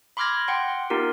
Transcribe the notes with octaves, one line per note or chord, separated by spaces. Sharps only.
B5 C6 D6 F6 G#6 A#6
F#5 G5 C6
B3 D#4 F4 G4 A#4